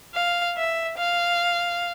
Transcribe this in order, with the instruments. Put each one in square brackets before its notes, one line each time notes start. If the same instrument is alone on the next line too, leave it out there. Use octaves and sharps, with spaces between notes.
[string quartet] F5
E5
F5